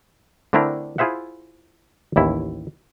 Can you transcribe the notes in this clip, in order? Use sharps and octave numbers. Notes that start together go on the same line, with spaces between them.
D3 A3 C4 D4 E4 A#4
E4 F4 G#4 C5 E5 F#5
A1 D#2 E4